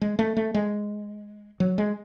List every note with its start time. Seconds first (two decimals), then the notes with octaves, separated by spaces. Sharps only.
0.01 G#3
0.19 A3
0.37 A3
0.54 G#3
1.60 F#3
1.78 G#3